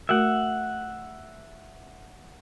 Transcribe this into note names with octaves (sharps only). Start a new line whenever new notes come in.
A3 F#4 A#4 E5 F#5